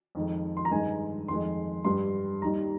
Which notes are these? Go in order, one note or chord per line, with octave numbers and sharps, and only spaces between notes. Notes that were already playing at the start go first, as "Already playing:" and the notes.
F2 D#3 G#3
C6
A#5
G2 D#3 G#3 G#5
F2 D#3 G#3 C6
G2 G3 C6
D#2 D#3 G3 A#5